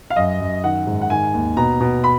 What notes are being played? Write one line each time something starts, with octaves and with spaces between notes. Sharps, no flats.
F5
F#2 D#5
F#2
D#3 F#5
G#2
F#5
D#3 G#5
D#2
B2 A#5
B2
B5